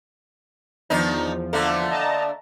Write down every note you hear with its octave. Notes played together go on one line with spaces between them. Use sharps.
E2 D#3 F3 D4 D#4
D3 A3 A#3
D#5 A5 A#5